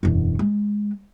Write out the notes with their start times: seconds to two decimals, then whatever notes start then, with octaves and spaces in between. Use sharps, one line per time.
0.03 E1 F#2
0.39 G#3